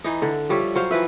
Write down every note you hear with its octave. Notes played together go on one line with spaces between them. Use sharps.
E3 D#4
D3
F3 G3 C#5 E5
F#3 C5 F5
E3 F3 B4 E5